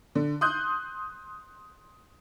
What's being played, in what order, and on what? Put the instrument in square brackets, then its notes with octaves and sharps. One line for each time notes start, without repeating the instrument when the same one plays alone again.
[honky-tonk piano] D3
C6 D#6 F#6 G6